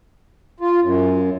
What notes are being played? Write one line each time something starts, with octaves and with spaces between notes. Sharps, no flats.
F4
F#2